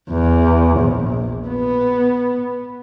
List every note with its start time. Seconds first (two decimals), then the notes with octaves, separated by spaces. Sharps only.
0.11 E2
0.80 A#1
1.48 B3